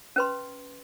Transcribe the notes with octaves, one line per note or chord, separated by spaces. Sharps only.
C#4 B4 C6